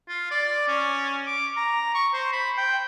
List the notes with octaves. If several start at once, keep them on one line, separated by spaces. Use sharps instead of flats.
F4
D5
C#4
D6
A#5
C#6
C5
B5
G5